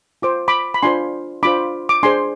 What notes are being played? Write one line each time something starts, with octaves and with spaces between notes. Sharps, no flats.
F4 C5 D6
B5 D6
B5
D4 F4 C5 G#5 C6
D4 F4 C5 B5 D6
D6
D4 G#4 C5 G#5 C6